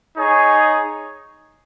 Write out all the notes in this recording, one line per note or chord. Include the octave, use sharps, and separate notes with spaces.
D#4 G#4 C#5